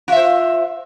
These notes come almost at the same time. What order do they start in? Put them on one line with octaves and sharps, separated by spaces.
F4 E5 C5